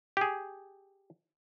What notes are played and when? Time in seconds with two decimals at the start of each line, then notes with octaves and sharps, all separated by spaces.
0.17 G4 G#4